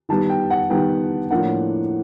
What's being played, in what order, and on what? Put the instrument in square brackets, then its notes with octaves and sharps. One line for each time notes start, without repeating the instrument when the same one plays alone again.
[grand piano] D#3 G3 B3 A5
G5
F#5
D#3 G3 B3 G5
A2 F3 A#3 D4 F#5